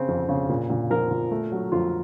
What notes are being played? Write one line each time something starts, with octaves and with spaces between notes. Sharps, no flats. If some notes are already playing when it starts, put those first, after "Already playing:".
Already playing: C#3 C4
F2
C#3
A#2
A#2
F3 A#4
A#2
A3
F#3
F2 F4